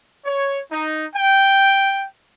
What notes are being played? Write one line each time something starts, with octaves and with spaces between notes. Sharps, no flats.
C#5
D#4
G5